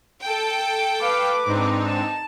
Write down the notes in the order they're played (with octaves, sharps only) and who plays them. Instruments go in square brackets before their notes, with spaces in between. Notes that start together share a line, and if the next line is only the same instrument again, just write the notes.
[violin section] A4 G5
[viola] B4 D6 [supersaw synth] F5
[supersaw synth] G#2 C4 D4 [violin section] D#4
[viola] A5